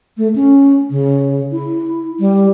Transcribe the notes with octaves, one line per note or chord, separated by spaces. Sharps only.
A3
C#4
C#3
E4
G3